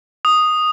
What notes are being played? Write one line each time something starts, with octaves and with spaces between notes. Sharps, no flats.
D#6